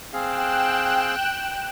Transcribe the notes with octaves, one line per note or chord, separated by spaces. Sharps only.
C4 G#4 F5 G5 F#6 E7